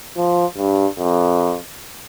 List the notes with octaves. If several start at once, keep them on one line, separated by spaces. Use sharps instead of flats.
F3
G2
F2